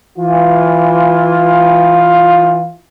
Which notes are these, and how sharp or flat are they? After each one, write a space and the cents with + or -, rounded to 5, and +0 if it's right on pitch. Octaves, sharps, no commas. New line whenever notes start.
E3 +0 F4 +10